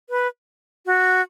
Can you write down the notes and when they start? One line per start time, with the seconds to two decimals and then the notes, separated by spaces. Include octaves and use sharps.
0.10 B4
0.86 F#4